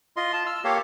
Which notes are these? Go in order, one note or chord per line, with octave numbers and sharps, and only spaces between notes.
F4 D#5 C6
F4 A5
E6 F6
A#3 G4 A4 C#5 F5